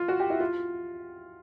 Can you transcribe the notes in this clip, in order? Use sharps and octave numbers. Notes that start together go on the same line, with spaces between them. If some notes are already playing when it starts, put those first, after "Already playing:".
Already playing: F4
F#4
G4
E4
F4